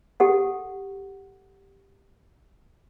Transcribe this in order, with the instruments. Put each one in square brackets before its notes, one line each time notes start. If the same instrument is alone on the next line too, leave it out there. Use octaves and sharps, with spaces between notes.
[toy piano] G4 A4 F#5